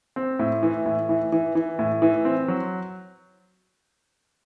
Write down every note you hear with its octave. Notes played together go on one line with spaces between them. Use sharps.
C4
A2
E3
A2
E3
E3
E3
A2
E3
C4
F#3